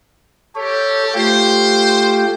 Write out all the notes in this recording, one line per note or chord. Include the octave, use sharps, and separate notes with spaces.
G3 G4 A4 C#5
A3 F4 G4 C5